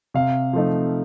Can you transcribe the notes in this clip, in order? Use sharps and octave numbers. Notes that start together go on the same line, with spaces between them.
C3 F5
F3 A3 D#4